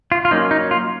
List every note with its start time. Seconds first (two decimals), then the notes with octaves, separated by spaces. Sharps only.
0.12 F4
0.25 F4
0.31 F#3 A#3 C#4 D#4
0.51 D#4
0.71 F4